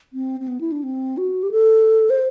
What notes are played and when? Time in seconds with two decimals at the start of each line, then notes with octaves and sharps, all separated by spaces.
0.13 C4
0.40 C4
0.48 B3
0.61 E4
0.72 D4
0.83 C4
1.17 F#4
1.43 G4
1.51 A4
2.10 C5